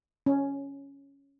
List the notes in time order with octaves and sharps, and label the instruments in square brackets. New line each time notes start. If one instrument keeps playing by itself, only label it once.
[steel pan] C#4